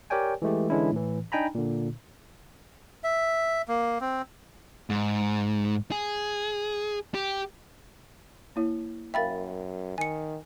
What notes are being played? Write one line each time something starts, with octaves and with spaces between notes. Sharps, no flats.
G4 A#4 C#5 D5 G5 G#5
E3 G#3 A3 G4
D3 E3 G#3 C#4 D4 E4
A2 E3
D4 D#4 G5 G#5 A#5 B5
A#2 D3
E5
A#3
C4
G#2
G#4
G4
A#3 E4 C#5
F#2 A#4 E5 F5 G5 B5 A6
D#3 G#5 C#7